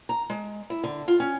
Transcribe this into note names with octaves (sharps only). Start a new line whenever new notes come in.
A#5
G#3
E4
D3
F4
C#4